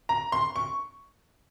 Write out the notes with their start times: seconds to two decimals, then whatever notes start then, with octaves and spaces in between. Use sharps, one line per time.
0.09 A#5
0.32 C6
0.56 C#6